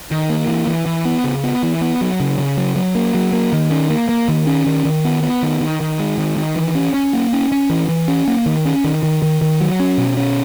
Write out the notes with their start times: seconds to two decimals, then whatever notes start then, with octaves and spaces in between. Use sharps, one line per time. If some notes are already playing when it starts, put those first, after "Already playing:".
0.11 D#3
0.30 A#3
0.48 E3
0.67 E3
0.86 E3
1.05 B3
1.24 C#3
1.44 B3
1.63 E3
1.81 B3
2.01 F#3
2.20 C#3
2.39 C#3
2.57 F#3
2.76 F#3
2.95 A#3
3.14 F#3
3.33 A#3
3.53 D#3
3.71 C#4
3.90 A#3
4.09 A#3
4.28 D#3
4.47 C#4
4.66 D#3
4.85 D#3
5.05 B3
5.23 B3
5.43 D#3
5.61 D#3
5.81 D#3
5.99 G#3
6.18 D#3
6.37 D#3
6.56 E3
6.75 C#4
6.94 C#4
7.13 A#3
7.33 C#4
7.52 C#4
7.70 E3
7.89 E3
8.08 C#4
8.28 A#3
8.46 D#3
8.65 C#4
8.84 D#3
9.03 D#3
9.22 D#3
9.41 D#3
9.61 F#3
9.80 C#4
9.98 B2
10.17 C#4